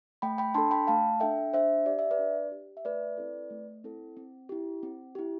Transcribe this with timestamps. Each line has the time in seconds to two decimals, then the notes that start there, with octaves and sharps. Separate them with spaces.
0.22 A3 G5 B5
0.38 G5 B5
0.55 D4 A5 C6
0.58 A4
0.71 G5 B5
0.87 A3 F5 A5
1.20 D4 A4 E5 G5
1.53 D4 C5 E5
1.86 G4 D5
1.99 E5
2.11 B4 D5
2.19 D4
2.52 G4
2.77 E5
2.85 A3 B4 D5
3.17 C4 E4 A4
3.50 A3
3.84 C4 E4 A4
4.17 C4
4.49 E4 G4
4.83 C4
5.15 E4 G4